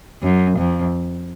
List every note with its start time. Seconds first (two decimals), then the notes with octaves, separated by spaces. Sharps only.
0.22 F#2
0.57 F2